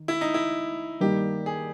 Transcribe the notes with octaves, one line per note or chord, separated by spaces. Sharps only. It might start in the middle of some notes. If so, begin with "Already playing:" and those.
Already playing: D#3
E4
D#4
E4
G2 D#3 G3 A#3 D#4 G4
G#4